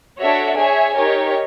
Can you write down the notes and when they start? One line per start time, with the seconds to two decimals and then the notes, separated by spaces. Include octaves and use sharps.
0.21 D4 F#4 A4 C#5 E5
0.59 G#4 C#5 E5 G#5
0.97 D#4 G4 A#4 C#5